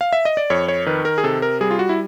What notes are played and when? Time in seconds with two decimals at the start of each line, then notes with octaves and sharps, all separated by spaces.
0.01 F5
0.13 E5
0.25 D#5
0.37 D5
0.50 F2 C#5
0.68 C#5
0.86 D#3 B4
1.05 A#4
1.18 G#4
1.24 C3 A4
1.42 A#4
1.61 G3 G#4
1.71 F4
1.79 F#4
1.89 E4